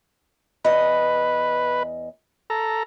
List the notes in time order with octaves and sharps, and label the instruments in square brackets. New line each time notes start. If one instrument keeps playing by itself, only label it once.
[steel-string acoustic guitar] E2 D#5 [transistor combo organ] B4
[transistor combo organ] A4 A#5